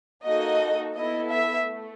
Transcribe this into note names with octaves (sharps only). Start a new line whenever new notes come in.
A#3 D#4 F#4 A4 D#5
B3 E4 A4 D#5
E5
A3